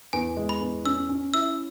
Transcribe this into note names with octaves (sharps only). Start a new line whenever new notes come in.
E2 G#5
G#3
B5
E2
C#4 E6
C#4
E4 E6